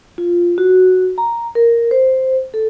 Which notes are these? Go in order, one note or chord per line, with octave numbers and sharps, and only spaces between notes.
F4
F#4
A#5
A#4
C5
A4